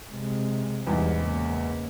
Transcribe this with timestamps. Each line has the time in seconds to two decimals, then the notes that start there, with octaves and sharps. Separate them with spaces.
0.13 C3 G#3
0.87 E2 G#2 G3
1.20 C#3 A#3